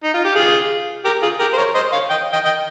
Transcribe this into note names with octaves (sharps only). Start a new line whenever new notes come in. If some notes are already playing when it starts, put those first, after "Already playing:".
D#4
F4
G4
F4 G#4
G4 A#4
F4 G#4
G4 A#4
C5
A#4 C#5
C5 D#5
C#5 F5
D#5 G5
D#5 G5
D#5 G5